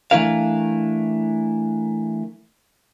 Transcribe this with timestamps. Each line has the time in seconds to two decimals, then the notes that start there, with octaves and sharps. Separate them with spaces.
0.11 E3 A3 D4 E4 A#4 F5